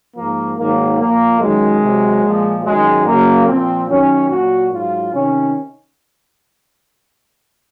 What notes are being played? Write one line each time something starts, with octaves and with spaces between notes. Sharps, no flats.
G#2 F3 A#3
G#2 D#3 F#3 A#3
A#2 F3 A#3
F#2 D#3 F#3 G#3
C3 F#3
A#2 F3
F#2 D#3 F#3 G#3
F#2 C#3 F#3 A#3
A#2 F3 C4
F#2 D#3 F#3 C#4
A#2 F#3 F#4
G#2 F#3 F4
C3 D#3 C#4